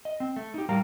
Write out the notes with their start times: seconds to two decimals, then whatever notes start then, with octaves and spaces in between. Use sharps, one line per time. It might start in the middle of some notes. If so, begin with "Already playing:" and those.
0.05 D#5
0.20 C4
0.36 A3
0.54 D#4 G4
0.69 A2 G3 A#4 F5 A#5